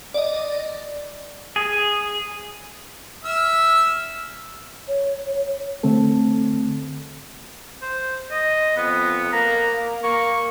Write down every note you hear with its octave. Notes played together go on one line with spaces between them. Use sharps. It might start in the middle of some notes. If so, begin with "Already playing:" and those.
D5 D#5
G#4
E5 E6 F6
C#5
D3 A3 C4 A4
C5
D#5
F2 B3
A#3 A#5
A#3
A#3 C#6